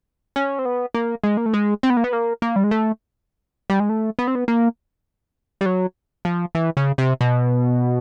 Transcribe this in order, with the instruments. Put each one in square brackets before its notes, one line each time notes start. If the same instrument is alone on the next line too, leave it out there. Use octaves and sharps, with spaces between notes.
[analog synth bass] C#4
C4
B3
A#3
G#3
A#3
A3
G#3
C4
B3
A#3
B3
A#3
A#3
G3
G#3
A3
G3
G#3
A3
B3
C4
B3
A#3
G3
F#3
F3
E3
C#3
C3
B2